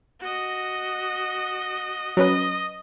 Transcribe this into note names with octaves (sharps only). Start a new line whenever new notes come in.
F#4 D#5
F#3 C#4 B4 D#5